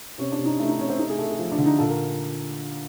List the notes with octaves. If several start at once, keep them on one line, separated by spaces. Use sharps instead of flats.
C3 C#4
D4
C3
D#4
A3 E4
D#4
C3 C#4
C4
A3 D#4
G#4
A3 A4
G#4
F3
D4
D3
D#4
A#2 A4
A#4